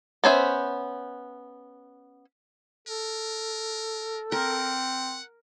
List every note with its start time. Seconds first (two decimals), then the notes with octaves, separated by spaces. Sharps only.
0.24 B3 C#4 C5 E5
2.88 A4 A#4
4.32 C4 A#4 F#5